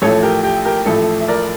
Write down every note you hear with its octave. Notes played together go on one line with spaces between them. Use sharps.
A1 A2 F3 A3 A4 C#5
G4 A#4
G4
G4 A#4
A1 A2 F3 A3 A4
E5
A#4 D5